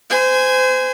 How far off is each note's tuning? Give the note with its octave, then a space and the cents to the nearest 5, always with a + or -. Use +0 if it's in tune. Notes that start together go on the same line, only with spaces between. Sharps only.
C5 -30 G#5 -10